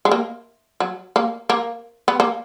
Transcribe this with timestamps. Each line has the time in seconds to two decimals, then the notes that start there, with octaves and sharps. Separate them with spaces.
0.05 G#3
0.12 A#3
0.80 F#3
1.16 A#3
1.50 A#3
2.08 B3
2.20 A#3